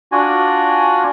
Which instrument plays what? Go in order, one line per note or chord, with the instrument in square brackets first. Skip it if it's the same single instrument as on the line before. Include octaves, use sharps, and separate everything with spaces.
[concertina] D4 F4 F#4 G#5